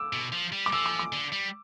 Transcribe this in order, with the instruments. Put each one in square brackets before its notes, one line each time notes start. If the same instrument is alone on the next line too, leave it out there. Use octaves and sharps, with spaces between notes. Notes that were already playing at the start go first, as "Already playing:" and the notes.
Already playing: [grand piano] D6 E6
[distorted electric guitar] B2
F3
G3
[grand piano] D6
[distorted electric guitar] F3 [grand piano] E6
[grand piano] D6
D6
[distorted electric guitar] D3
G3